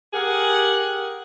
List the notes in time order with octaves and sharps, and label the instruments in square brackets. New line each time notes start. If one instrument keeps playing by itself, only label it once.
[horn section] G4 G#4 A#4 F#5